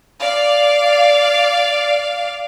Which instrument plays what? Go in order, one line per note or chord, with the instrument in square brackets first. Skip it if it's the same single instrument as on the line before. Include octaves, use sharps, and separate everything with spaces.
[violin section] D5 F5